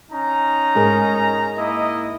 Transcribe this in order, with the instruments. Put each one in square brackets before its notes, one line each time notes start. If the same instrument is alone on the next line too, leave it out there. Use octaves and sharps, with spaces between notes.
[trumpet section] C#4 D#4 A#5
[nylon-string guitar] G#2 G#4 A#4
[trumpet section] A#3 E4 D#5